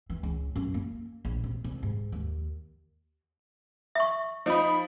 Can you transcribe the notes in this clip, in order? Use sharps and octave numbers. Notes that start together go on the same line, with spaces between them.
E3
C#2
F#2
A#3
A#1
C3
C2
G#2
D#2
E5 C#6
F3 D#4 B5